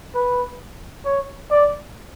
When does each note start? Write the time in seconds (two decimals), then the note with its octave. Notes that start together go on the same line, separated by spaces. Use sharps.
0.15 B4
1.06 C#5
1.51 D5